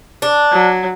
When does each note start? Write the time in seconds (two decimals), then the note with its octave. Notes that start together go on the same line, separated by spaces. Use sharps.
0.22 D4
0.52 F#3